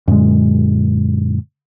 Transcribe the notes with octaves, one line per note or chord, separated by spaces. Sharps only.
F#2 A#2 D3 G#3